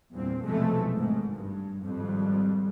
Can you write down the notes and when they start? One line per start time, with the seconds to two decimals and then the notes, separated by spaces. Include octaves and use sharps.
0.12 E2 G2 A#2 C4
0.44 B1 F2 C3 E3 G#3 A3
0.94 G#1 G#2
1.36 G2
1.83 G#1 F2 G3